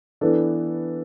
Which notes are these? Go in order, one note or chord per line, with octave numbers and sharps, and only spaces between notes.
E3 B3 D4 A4